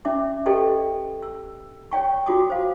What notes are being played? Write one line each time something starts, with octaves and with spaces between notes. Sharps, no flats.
C#4 D5 E5 D6
G4 A4 B4 D5 D#5 G5
E6
C#5 D5 G5 C#6
F4 F#4 D6 D#6
C5 F5